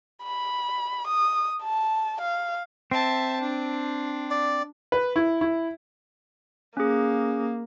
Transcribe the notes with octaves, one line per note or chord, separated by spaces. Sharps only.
B5
D#6
A5
F5
C4 E5 A5
D4
D5
B4
E4
E4
A#3 C#4 G#4